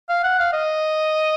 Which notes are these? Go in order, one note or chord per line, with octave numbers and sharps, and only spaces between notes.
F5
F#5
F5
D#5